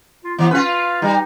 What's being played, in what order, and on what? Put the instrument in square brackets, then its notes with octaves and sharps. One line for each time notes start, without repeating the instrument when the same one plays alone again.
[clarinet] F4
[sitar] E3 [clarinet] B3
[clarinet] C#4 [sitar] F4 B4
[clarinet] F5
[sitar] G3 [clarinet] D#4